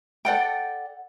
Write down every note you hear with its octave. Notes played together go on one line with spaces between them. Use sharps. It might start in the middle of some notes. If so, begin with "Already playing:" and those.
A4 D5 F#5 G5